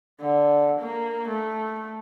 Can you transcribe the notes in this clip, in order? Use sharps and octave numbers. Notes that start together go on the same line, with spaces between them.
D3
A#3
A3